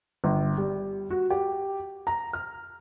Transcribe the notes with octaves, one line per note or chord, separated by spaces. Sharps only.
G1
G3
F#4
G4
A#5
F6